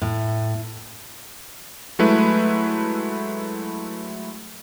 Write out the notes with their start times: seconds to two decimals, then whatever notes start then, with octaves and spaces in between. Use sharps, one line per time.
0.02 A2
1.99 F#3 G#3 A3 E4 B4